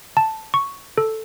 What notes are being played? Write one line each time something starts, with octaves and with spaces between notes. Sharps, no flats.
A5
C#6
A4